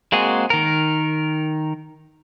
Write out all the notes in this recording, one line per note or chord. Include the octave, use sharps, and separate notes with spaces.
G#3 A#3 C4 F#4 G#4
D#3 A#4